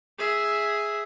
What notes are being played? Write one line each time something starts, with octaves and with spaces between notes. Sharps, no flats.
G#4 E5